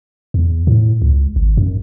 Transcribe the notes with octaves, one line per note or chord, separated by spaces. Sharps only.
E2
A2
C#2
G#1
F#2